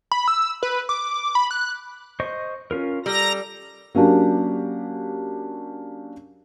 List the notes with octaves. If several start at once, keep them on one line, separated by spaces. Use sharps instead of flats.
B5
E6
B4
D6
B5
F#6
C5 D#5 C#6
C#4 F4 A#4
G3 A4 A#5 A#6
F#3 A#3 C#4 D4 G4